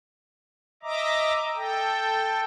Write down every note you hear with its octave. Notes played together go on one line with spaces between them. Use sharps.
D#5 E5 A#5 D6
A4 G5